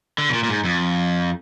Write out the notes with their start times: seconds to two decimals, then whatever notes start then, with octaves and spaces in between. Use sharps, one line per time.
0.18 D3
0.29 B2
0.34 A#2
0.44 A#2
0.49 G#2
0.64 F2